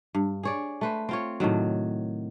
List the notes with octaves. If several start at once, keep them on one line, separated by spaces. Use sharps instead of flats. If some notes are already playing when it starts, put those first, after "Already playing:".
G2
G#4 C#5 D5
A3 B4 C5
C4 F4 C#5
A2 C3 D#3 F#3